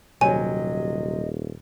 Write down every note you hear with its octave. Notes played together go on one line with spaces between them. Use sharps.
D#1 C3 F#3 D#5 G#5